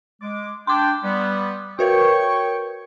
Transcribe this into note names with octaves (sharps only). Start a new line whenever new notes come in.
G#3 D6
D4 G5 C6 D6
G3 B3
F#4 A#4 B4 C#5 G5 C#6